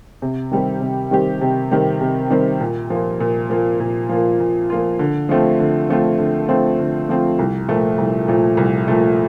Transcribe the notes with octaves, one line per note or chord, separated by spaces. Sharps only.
C3
D#3 G3 C4 G4
C3
D#3 G3 C4 G4
C3
D#3 G3 C4 G4
C3
D#3 G3 C4 G4
A#2
F3 A#3 F4
A#2
F3 A#3 F4
A#2
F3 A#3 F4
A#2
F3 A#3 F4
D3
F3 A3 C4 F4
D3
F3 A3 C4 F4
D3
F3 A3 C4 F4
D3
F3 A3 C4 F4
C2
A#2 F3 A3
C2
A#2 F3 A3
C2
A#2 F3 A3